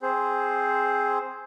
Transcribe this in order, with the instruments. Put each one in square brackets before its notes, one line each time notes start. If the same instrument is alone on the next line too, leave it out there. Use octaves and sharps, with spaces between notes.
[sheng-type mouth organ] C4 G#4 C5